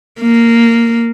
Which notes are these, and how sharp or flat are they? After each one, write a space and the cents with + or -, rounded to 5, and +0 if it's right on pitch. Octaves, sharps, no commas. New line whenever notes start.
A#3 -10